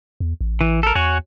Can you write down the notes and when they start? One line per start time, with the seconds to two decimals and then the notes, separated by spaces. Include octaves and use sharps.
0.20 E2
0.41 A1
0.61 E3
0.83 A4 A#4
0.95 E2 F#4 C#5 G#5